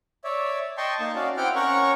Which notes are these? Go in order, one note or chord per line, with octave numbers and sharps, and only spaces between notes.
C#5 D5 E5
D#5 G5 A5 C6 C#6
A#3 D#4 A5
C#4 F#4 D5 F5
C4 E4 F#5 G5 D6 F6
C#4 A#4 C#5 F#5 C#6